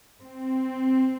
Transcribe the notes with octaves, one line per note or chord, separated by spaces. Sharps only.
C4